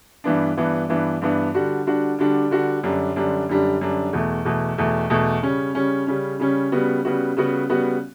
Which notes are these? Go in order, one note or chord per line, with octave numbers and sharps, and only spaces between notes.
G2 E3 B3 D4
G2 E3 B3 D4
G2 E3 B3 D4
G2 E3 B3 D4
D3 G3 D4 F#4
D3 G3 D4 F#4
D3 G3 D4 F#4
D3 G3 D4 F#4
F#2 D3 G3 D4
F#2 D3 G3 D4
F#2 D3 G3 D4
F#2 D3 G3 D4
E2 B2 A3
E2 B2 A3
E2 B2 A3
E2 B2 A3
C#3 G3 C#4
C#3 G3 C#4
C#3 G3 C#4
C#3 G3 C#4
C#3 G3 B3 F#4
C#3 G3 B3 F#4
C#3 G3 B3 F#4
C#3 G3 B3 F#4